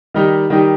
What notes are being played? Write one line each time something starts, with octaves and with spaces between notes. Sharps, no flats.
D#3 G3 D#4 G4
D#3 G3 D#4 G4